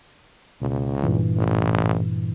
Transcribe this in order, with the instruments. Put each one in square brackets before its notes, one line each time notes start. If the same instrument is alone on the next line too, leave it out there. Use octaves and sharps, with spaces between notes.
[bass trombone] C#2 [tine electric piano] B2
[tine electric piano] G2 A#2 E3
[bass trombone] A1